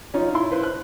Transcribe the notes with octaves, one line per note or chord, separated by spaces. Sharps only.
C#4 D#4 F4
E4 C6
E4 B4 C5
F#6